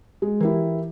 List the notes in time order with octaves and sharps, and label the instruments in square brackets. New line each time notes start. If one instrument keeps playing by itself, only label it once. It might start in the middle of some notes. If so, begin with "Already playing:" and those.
[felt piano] G#3
[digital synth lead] E3 [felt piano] E4 G4 A#4